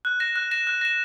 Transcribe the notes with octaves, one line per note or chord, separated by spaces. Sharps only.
F#6
A#6 E7
F#6
A#6 E7
F#6
A#6 E7